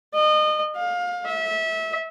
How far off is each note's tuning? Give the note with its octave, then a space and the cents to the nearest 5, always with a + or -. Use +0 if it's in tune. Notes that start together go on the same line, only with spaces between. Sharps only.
D#5 -30
F5 +25
E5 -25